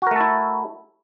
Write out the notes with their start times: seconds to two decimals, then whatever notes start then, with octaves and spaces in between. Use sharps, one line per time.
0.02 F#4
0.07 A#4
0.11 A3
0.16 A4
0.21 E4